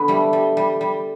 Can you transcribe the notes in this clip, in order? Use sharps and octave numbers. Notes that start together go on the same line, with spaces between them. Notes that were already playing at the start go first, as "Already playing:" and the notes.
Already playing: D3 B3
G3 A3
G3
G3
G3